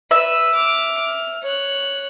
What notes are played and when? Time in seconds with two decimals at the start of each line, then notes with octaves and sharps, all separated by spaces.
0.11 B4 E5
0.55 D6 F6
1.06 F6
1.43 C#5 F#6